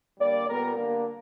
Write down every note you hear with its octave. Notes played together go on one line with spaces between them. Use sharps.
D3 G3 A#3 D5
A#2 G3 B3 A#4
D3 G3 A#3